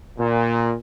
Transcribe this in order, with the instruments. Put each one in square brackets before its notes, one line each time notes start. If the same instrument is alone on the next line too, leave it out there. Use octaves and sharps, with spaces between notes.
[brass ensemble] A#2